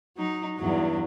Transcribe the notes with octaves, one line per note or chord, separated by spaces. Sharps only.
F#3 D#4
E2 G2 F#3